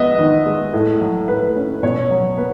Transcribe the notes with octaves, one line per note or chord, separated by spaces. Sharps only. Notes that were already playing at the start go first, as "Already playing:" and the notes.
Already playing: G#3 B3 D#5 E5
D#3
G#3
A2
F#3
A2 B4
C#4
B2 C#5
F#3
B3 B4